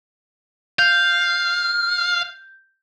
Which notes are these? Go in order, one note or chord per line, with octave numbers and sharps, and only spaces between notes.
F5 G6